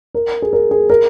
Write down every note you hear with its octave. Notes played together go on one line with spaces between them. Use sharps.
A#4
G#4
A#4
G#4
A#4